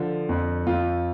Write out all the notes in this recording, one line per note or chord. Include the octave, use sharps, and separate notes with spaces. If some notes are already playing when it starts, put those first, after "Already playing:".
Already playing: D3 F3
F2
F2 F4